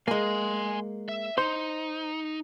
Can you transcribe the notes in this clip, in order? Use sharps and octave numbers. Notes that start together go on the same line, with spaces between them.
G#3 A#3 G#5 C6
E5
D#4 C5